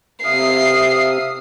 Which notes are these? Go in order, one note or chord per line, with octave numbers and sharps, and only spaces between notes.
C3 E5 F5 D#6 C7